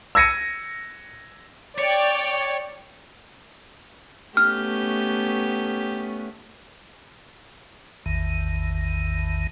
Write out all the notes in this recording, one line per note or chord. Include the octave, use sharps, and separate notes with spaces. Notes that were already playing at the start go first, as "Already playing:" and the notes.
E6 G#6 A#6 C#7 D#7
C#5 D5 G5
A3 B3 C#4 G4 F6
A1 E2 D#3